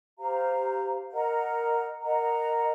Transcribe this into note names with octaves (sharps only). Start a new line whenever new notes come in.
G4 C5 F5 A#5
A#4 D#5 F#5 A#5
A#4 D#5 F#5 A#5